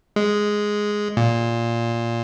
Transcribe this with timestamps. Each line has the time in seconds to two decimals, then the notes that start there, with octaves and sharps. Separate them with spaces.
0.16 G#3
1.17 A#2